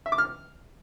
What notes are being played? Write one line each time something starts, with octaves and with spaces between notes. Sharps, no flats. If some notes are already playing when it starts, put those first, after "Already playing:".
E5
D6
F6